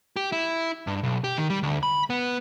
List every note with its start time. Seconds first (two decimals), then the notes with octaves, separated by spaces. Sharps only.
0.16 G4
0.32 E4
0.87 G2
1.04 B1
1.24 G4
1.38 D#3
1.50 G3
1.63 D2
1.83 B5
2.10 B3